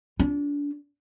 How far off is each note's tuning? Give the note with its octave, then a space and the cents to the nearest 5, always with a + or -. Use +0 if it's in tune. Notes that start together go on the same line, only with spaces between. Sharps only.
D4 -30 F4 +0